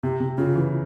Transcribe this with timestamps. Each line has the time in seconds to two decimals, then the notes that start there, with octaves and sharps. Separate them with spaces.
0.03 C3 G4
0.20 C3
0.38 C#3 F4
0.55 E3